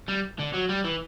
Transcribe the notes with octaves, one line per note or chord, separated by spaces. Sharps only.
G3
D3
F#3
G3
E3